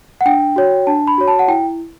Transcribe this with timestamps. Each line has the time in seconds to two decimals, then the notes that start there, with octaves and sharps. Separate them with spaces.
0.21 F#5
0.26 D4 G5
0.56 F#4 C#5
0.87 D4 A5
1.08 B5
1.18 F#4 C#5
1.28 A5
1.39 F#5
1.48 E4 G5